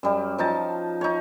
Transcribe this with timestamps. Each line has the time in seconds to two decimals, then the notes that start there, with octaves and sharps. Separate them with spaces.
0.03 F#2 G3
0.38 F3 D#4 A5
1.01 D#4 C#5